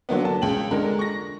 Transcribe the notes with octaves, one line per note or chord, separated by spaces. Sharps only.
D3 F#3 A#3 B3
A5
C#2 G5 F#7
D3 G#3 A#4
C#6 A#6